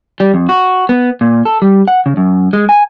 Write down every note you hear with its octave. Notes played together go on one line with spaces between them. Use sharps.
G3
F2
F#4
B3
A#2
A4
G3
F#5
C#3
F#2
G#3
G#5